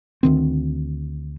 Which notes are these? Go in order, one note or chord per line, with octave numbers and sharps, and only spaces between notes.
D2 D#3 C4